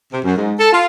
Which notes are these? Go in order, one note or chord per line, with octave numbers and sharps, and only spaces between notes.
C3
F#2
G#2
A4
F4